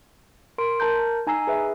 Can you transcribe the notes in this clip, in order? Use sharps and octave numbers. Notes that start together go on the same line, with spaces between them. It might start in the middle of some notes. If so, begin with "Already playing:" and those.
A#4 C6 D7
A#4 A5 A#5 G6
D#4 G#5 A#5 E6 C7
G#4 B4 E5